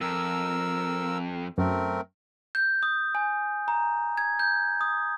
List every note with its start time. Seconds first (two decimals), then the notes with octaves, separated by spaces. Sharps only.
0.01 F2 A#4 E6
1.58 F#2 A3 C4 A#4
2.55 G6
2.83 D#6
3.15 G#5
3.68 A#5
4.18 G#6
4.39 G6
4.81 D#6